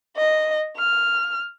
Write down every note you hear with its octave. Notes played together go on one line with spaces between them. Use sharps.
D#5
F6